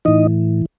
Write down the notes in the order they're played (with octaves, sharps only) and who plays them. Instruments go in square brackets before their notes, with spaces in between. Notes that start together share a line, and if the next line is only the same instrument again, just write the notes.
[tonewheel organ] A2 E3 D#4 D#5